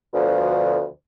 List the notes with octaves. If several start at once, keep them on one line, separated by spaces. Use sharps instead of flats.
D2 B2 D3 F3